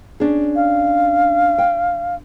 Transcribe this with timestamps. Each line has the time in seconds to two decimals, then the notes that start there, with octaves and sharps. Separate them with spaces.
0.20 C#4 D4 G#4
0.56 F5
1.58 G5